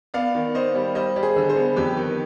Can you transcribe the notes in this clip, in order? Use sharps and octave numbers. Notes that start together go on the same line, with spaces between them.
B3 D5 F5
D#3
B3 C5 D#5
G3
G3 C5 D#5
G3
G#4 C5
D3
G#4 C5
B3
F2 G4 B4
D#3